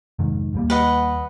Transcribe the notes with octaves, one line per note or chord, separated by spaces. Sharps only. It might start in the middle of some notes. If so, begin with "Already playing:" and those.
F1 G#2 D#3
D#2 G3 A#3
B4 D#5 F#5